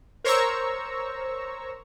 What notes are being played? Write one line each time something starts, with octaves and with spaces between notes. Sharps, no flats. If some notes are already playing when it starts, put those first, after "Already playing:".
A#4 C5 C#5 A#5 C#6 E6